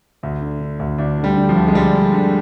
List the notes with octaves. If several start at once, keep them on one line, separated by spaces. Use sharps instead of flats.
D2
D3
D3
D2
D2 D4
D3
G3
D3
F3
D2
G#3
D2 G3
D3
D3